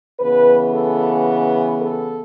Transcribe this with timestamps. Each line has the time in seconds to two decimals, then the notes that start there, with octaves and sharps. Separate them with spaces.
0.19 C#3 E3 B3 B4
0.72 A4
1.80 A4